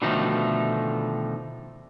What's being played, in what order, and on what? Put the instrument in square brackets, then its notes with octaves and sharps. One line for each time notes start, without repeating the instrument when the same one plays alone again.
[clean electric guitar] B2 D3 D#3 F3 A3 D#4